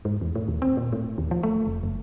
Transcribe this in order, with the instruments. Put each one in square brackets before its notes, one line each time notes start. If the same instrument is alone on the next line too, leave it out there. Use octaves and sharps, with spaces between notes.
[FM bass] G#2
E2
A2
D#2
C4
A#2
A2
D#2
F3
A3
F1
F#1